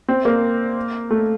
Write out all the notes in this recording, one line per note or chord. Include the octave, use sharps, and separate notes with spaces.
C4
A#3
A3